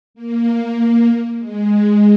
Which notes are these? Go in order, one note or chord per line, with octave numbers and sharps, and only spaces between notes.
A#3
G#3